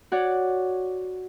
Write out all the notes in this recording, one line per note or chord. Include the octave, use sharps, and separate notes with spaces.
F#4 C#5 D5 F#5